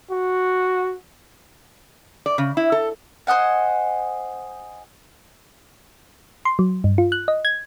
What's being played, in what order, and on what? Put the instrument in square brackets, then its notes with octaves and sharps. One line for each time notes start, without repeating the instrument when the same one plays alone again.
[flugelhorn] F#4
[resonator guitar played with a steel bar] D5
C#3
E4
A4
[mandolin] C5 D#5 F#5 G#5
[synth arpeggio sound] C6
F#3
G2
F4
F#6
D#5
G#6